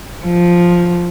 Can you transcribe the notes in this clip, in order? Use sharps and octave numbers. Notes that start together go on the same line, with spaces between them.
F3